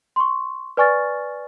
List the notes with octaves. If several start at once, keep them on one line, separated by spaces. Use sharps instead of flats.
C6 C#6
B4 D5 G#5 C#6 F6 A6